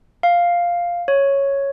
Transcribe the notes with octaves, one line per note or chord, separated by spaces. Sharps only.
F5
C#5